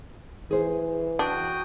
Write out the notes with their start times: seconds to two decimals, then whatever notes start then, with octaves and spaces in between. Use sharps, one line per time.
0.51 E3 G#4 C5
1.19 D4 F#4 G5 D#6